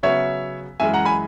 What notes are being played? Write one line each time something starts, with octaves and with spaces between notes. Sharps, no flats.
C#3 F#3 B3 C#5 E5
F#2 E3 G#3 E5 G#5
F#5 A#5
G#5 B5